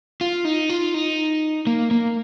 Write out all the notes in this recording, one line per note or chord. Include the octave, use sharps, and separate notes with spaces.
F4
D#4
F4
D#4
A#3
A#3